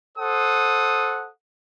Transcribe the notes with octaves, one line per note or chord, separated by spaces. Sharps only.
A4 C5 F#5 D#6